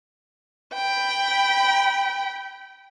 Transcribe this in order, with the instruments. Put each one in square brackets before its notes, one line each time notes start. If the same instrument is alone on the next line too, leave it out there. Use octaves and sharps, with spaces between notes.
[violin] G5 B5